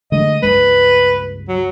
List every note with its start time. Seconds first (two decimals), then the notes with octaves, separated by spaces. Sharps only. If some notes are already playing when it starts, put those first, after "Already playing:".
0.12 D3 G#3 A3 D#5
0.42 C#2 G2 G#3 B4
1.48 F#3